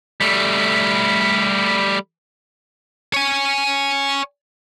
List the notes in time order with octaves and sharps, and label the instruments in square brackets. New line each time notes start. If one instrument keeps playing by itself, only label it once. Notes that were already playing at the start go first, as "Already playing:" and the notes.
[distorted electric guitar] G3 A3
C#5 G#5